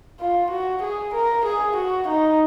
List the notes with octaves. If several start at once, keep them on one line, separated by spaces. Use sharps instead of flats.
F4
F#4
G#4
A#4
G#4
F#4
D#4